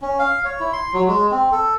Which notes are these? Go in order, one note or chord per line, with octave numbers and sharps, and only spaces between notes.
C#4
F5
C#5
E4
C6
F#3
G#3
C4
A4